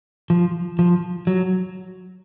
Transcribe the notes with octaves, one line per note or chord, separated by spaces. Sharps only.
F3
F3
F#3